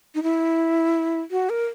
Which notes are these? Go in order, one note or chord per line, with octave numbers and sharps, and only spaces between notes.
D#4
E4
F#4
A#4